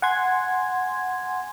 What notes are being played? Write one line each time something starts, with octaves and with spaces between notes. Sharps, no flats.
F#5 G#5 C6 G#6